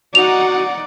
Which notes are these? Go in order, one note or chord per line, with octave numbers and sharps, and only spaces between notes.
D#4 F#4 D5 F#5 F7